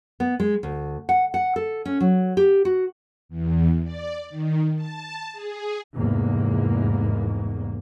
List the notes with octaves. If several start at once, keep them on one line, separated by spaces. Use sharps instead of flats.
B3
G#3
D2
F#5
F#5
A4
C#4
F#3
G4
F#4
E2
D5
D#3
A5
G#4
F1 E2 G#2 A#3